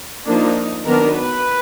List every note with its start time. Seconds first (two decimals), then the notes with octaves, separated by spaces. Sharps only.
0.25 F3 A#3 D4 D#4
0.85 D#3 F#3 B3 D4 A#4
1.15 B4